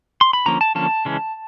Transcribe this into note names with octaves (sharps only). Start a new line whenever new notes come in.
C6
B5
D3 F3 A#3 C#4 A#5
A5
D3 F3 A#3 C#4 A5
C#3 E3 G#3 C#4